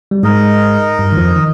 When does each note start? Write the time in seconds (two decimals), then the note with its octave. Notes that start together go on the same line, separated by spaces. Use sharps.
0.11 G3
0.23 G#2 G#3 D#4 A#4 D#5
0.98 G2 G3
1.12 D#3
1.17 F2 F3
1.36 D#3